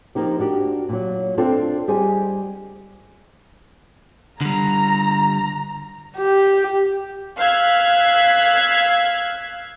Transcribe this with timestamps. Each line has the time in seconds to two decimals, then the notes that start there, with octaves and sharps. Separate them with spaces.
0.15 F3 A#3 D#4 G4
0.39 D4 F#4 G4
0.89 A#2 F#3
1.38 C4 D4 F4 A4
1.88 G3 G4 G#4 C5 D#5 G#5
4.41 D3 G3 A#5
6.17 G4
7.39 F5 E6 F#6 G#6 B6